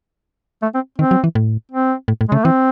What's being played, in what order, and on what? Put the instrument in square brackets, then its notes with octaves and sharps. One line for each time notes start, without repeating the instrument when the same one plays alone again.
[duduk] A3
C4
[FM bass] D#3 [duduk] C4
[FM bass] F#3
E3
A2
[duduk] C4
[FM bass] A2
A2
[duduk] G#3
[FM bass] C#3
[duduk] A3
[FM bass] E3 [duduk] C4